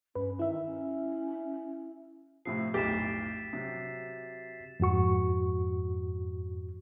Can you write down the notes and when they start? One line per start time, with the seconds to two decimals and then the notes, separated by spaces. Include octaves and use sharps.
0.15 G2 C#4 B4
0.39 D#3 E4 E5
0.66 C#4
2.45 A2 C3 F3 C7
2.74 B1 F2 A2 G4 A6 B6 E7
3.53 C3 F#3
4.80 F2 G#2 F#4 C#6